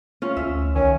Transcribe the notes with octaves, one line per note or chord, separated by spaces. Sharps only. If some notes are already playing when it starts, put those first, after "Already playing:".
C#4 F4
D2 E5
C2 D#3 C#4